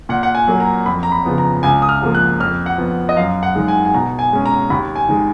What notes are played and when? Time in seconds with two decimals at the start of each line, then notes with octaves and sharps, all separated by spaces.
0.09 A#2 F#5
0.23 F#5
0.35 G#5
0.47 F#3 A#3
0.60 A#5
0.86 F2 B5
1.03 A#5
1.12 B5
1.25 C#3 F3 B3
1.38 A#5
1.63 C#2 G#5
1.82 D#6
1.89 F6
2.02 C#3 F3 A#3
2.15 F#6
2.40 F2 F6
2.66 F#5
2.78 F3 B3
3.09 D#5
3.16 F#2 F5
3.43 F#5
3.55 D#3 G#3
3.68 G#5
3.85 G#5
3.94 B2 A#5
4.19 G#5
4.33 G#3 C#4
4.46 A#5
4.70 D#2 B5
4.96 G#5
5.08 D#3 G#3